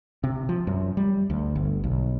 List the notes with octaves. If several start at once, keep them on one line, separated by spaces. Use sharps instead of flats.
C3
F3
F#2
G3
D2
G1
B1